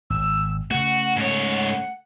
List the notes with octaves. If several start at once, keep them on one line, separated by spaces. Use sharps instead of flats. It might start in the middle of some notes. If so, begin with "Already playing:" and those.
G#1 E6
C#3 A3 F#4 F#5
G#2 C#5 F#5